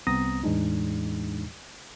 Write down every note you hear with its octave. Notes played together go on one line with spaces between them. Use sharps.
C2 B3 C4 A#5 D#6 A#6
E2 A2 E3 G#3 D4 D#4